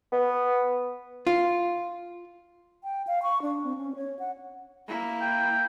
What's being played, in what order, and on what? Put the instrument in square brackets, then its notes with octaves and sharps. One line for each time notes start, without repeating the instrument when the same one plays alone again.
[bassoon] B3
[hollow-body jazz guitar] F4
[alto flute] G5
F5
C#6
D4
C4
C#4
C#5
F#5
[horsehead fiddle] A#3 E4
[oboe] G5